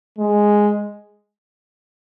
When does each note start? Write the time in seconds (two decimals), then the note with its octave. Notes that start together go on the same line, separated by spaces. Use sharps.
0.18 G#3